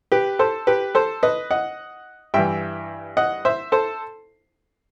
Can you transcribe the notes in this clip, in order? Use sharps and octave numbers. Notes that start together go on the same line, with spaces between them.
G4 B4
A4 C5
G4 B4
A4 C5
B4 D#5
D#5 F#5
G2 E3 E5 G5
D#5 F#5
C5 E5
A4 C5